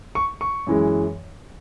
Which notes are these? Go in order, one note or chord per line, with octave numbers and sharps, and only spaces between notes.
C#6
C#6
F#2 E3 G#3